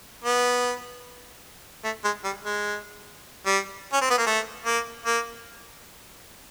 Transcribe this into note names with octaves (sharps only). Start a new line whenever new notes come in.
B3
A3
G#3
G3
G#3
G3
C#4
C4
B3
A#3
A3
A#3
A#3